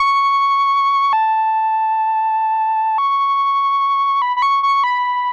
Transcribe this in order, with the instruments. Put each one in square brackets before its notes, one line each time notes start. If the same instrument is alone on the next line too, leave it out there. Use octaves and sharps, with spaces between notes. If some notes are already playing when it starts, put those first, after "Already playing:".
Already playing: [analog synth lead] C#6
A5
C#6
B5
B5
C#6
C#6
B5